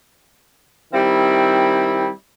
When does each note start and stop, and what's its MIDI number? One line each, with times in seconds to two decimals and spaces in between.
0.93 2.08 51
0.93 2.08 55
0.93 2.08 60
0.93 2.08 64